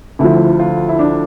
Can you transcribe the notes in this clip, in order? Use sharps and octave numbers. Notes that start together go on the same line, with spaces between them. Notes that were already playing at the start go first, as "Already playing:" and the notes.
D2 D3 F3 E4
F4
E4
D4